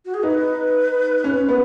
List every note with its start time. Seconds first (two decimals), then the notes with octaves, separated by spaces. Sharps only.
0.05 F#4
0.14 G#4
0.23 D#4 B4
1.24 C#4
1.48 B3